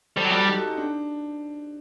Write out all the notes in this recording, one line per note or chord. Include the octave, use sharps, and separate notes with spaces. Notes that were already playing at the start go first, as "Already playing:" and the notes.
G3 A4 C5
F#3
G3 F#4 A4
D#4 G4
F#4 A4
D#4
D4